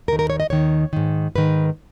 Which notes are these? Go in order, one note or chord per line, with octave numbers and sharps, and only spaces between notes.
D#2 D#3 A#4
A#4
C#5
D#5
D#2 D#3 C#5
G#2 D#3
G#2 D#3 B4